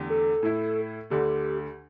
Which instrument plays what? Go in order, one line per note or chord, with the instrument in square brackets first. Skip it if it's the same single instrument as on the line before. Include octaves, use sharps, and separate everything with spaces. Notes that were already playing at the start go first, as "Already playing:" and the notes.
Already playing: [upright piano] E2 D3 A3 G4
[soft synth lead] A4
[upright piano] A2 A3 E4
[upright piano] D2 D3 A3 [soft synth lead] G4